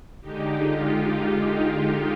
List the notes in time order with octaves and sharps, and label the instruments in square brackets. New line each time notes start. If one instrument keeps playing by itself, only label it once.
[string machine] D3 G#3 D#4 G4
F4
D#4
F4